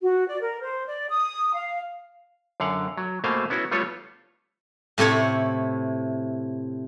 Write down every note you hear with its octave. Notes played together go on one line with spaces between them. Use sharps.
F#4
D5
A#4
C5
D5
D#6
F5
F#2 D3 F5 F#5
F#3
B2 A3 A#3 C5 F5 G#5
B3 C#4 E4 F#4
G3 A3 B3 F4 A4 C#5
A2 C3 A3 E4 C#5